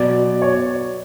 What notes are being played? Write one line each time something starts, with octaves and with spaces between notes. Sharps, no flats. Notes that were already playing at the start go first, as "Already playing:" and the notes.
Already playing: B2 F#3 D5
C#5